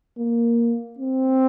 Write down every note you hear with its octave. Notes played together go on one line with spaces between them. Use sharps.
A#3
C4